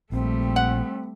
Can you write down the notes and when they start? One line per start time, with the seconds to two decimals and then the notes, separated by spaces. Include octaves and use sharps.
0.12 A#1 G3 A3 C4
0.56 F#5